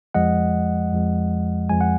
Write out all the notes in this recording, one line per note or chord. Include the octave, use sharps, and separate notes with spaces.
F2 F3 G#3 D#5 F#5
F2 F3 G#3
F2 F3 G#3 G#5
F#5